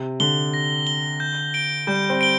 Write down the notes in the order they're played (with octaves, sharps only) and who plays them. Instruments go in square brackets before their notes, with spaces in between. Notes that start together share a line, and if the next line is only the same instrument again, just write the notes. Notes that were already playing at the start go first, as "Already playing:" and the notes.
Already playing: [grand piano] C3
[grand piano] D3 [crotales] G7
[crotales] A#6
G7
G6
D7 G7
[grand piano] G3 [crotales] G6
[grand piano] C4
[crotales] D7 G7